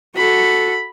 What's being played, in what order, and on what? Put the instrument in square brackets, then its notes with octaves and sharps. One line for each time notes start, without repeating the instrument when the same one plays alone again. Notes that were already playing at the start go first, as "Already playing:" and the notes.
[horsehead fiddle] F#4 A4 [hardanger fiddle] B5